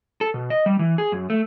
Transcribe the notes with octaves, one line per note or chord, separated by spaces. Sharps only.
A4
B2
D#5
G3
E3
G#4
F#2
A3